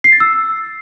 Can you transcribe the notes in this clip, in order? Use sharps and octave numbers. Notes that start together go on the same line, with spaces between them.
C7
A6
E6